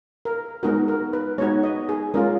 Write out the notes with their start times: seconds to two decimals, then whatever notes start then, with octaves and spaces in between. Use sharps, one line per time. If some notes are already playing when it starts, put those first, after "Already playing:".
0.25 A#4
0.63 G#3 B3 D#4 F#4 A#4
0.88 A#4
1.13 B4
1.38 G#3 B3 D#4 F#4 C#5
1.63 D#5
1.89 G#4
2.14 G#3 C#4 F4 A#4